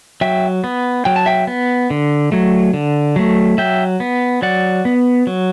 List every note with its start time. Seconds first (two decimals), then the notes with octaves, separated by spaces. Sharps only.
0.21 F#3 E5 G5
0.64 B3
1.05 F#3 G5
1.16 A5
1.26 E5 G5
1.47 B3
1.90 D3
2.32 F#3 A3
2.74 D3
3.16 F#3 A3
3.58 F#3 E5 G5
4.00 B3
4.42 F#3 D5 F#5
4.85 B3
5.27 F#3